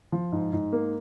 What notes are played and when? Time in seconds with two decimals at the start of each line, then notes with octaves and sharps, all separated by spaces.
0.12 F3
0.32 G#2
0.53 G#2
0.72 A#3